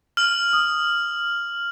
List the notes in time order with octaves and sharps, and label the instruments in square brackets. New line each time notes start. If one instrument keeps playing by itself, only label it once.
[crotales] F6 F#7
[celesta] D#6